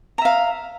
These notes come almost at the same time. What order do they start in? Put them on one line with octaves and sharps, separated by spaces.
A#5 E5 F5